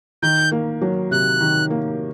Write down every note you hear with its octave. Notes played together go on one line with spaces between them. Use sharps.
D#3 G6
A#3
F#3
C3 F#6
D#3
A#3